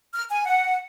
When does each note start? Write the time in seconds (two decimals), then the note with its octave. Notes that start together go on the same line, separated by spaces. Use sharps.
0.14 F6
0.30 G#5
0.45 F#5